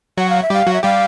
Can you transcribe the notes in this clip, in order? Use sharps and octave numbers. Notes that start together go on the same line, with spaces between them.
F#3 F#4 F#5
F5
E5
G3 G4 F5
F#3 F#4
E5
G3 G4 F5